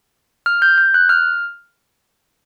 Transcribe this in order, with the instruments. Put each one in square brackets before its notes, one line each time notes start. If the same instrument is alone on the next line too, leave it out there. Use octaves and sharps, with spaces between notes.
[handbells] F6
G6
G6
F#6
F6